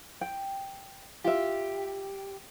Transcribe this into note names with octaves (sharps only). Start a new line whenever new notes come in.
G5
F4 G4 E5